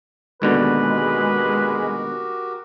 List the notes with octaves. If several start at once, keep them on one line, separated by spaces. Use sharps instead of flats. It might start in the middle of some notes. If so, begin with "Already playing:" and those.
D#2 B2 D3 G#3 F#4 G4 A#4 B4